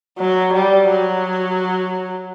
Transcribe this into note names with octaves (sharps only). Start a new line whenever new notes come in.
F#3
G3
F#3